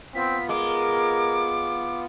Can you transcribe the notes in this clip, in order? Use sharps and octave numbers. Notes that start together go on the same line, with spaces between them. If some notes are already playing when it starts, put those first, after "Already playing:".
B3 C4 F4 B6
G#3 A#4 D6